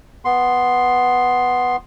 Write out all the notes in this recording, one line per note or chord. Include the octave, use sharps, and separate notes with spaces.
B3 C6